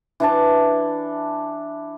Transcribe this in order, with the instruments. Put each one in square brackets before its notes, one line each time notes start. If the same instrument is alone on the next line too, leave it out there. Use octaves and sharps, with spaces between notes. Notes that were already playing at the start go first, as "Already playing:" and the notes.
[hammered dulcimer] E3 D4 A5